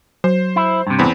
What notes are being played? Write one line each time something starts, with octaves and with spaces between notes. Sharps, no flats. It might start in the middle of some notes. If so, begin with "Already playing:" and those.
F#3 C5
E4
G2 C3
E2 C4 B5